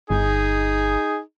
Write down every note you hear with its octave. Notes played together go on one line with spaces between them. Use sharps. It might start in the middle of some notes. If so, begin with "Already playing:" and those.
G1 D#4 G#4